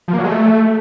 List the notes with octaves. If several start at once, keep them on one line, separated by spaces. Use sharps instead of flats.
F3
A#3
F#3
G#3
A3